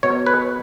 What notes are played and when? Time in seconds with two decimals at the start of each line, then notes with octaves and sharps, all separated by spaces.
0.03 B2 C#5
0.26 B4